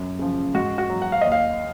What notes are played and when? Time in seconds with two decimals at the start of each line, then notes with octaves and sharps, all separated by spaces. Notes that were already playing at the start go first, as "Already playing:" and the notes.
Already playing: F#2
0.19 C#3 F3
0.54 G#2 F#4
0.78 F#4
0.90 F#3
1.02 F#5
1.12 F5
1.21 D#2 D#5
1.32 F5